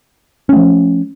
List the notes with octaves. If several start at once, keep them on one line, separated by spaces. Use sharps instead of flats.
F3 A3 C#4